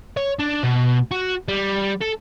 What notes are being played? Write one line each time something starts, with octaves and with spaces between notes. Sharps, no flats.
C#5
D4
B2
F#4
G3
A4